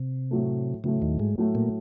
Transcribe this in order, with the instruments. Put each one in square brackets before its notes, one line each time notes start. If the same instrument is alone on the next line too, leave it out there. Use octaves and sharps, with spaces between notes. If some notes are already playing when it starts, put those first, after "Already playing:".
Already playing: [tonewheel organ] C3
[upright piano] A2 F#3 A3
[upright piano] A2 F#3 A3 [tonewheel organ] C#3
[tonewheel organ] D#2 D#3
G#2 G#3
[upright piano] A2 F#3 A3
[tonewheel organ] A#2 A#3